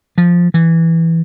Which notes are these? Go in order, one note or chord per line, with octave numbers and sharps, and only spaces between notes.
F3
E3